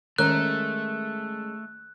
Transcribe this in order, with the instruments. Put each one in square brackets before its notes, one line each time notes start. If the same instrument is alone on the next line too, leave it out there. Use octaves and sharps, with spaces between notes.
[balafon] D#3 [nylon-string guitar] G#3 C#4 A#4 [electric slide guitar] A3 [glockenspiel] F#6